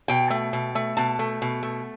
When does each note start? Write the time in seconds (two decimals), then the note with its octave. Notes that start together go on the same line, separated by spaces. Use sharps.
0.08 B2 G5
0.30 A3
0.53 B2
0.75 A3
0.97 B2 A5
1.19 A3
1.42 B2
1.63 A3